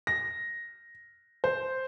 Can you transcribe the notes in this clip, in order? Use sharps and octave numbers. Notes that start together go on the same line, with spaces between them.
A#6
C5